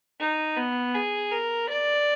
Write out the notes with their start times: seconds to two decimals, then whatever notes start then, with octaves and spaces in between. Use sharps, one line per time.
0.20 D#4
0.57 B3
0.94 G#4
1.32 A#4
1.69 D5